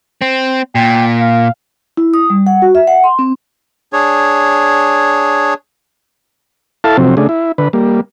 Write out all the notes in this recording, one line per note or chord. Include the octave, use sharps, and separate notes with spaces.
C4
A#2 G5
F5
E4
D#6
G3
F#5
F#4
E5
F#5
C6
C4
D4 G#4 C#5
E4 A4 F5 A5
C3 F3 F#3 C4
C#3 A3 D4 G#4
E4
D3 B4
G3 A#3